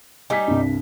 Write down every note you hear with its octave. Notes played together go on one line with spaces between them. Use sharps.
G3 D#4 G#5 B6
C2 G2